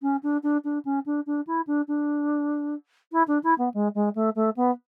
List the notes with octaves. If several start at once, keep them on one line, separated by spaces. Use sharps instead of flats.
C#4
D4
D4
D4
C#4
D4
D4
E4
D4
D4
E4
D4
E4
B3
G#3
G#3
A3
A3
B3